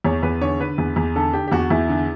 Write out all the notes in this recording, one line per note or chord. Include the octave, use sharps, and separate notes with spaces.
E2 C#5
E2 B4
D3 C#5
D3 B4
E2
E2
D3 A4
D3 G4
G4
E2 F#4
E2 E4
D3